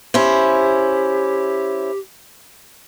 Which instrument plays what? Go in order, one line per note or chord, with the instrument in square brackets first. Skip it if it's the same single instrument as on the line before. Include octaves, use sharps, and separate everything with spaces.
[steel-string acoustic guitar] C#4 E4 C5 [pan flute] G4